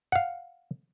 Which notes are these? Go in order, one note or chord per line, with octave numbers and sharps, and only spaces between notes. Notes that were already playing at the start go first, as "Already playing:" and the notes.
F5 F#5